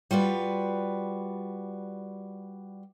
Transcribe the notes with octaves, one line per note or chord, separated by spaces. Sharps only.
G3 F4 F#4 B4